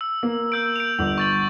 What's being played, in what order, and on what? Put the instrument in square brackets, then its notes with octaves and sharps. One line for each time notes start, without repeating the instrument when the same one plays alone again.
[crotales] E6
[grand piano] A#3
[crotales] E6 G6 D7
D7 F7
[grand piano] G1 [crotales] F#7
[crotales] C#6 A6 F#7